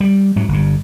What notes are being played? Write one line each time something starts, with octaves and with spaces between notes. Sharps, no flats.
G3
G#2 F#3
G1 G2